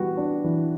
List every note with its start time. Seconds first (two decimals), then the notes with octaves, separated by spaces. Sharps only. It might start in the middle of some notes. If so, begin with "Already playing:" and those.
Already playing: E3 G3 B3 F#4
0.17 D4
0.44 E3